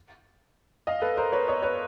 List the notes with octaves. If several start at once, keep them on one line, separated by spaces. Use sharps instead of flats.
D#5 F5
A4 B4
A#4 C5
B4 C#5
C#5 D#5
B4 C#5